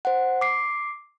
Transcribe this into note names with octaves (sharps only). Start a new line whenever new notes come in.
C5 F#5
D6 C7